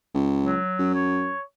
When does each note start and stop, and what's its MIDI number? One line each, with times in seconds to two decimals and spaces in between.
0.15 0.58 37
0.43 0.91 54
0.79 1.32 42
0.94 1.43 73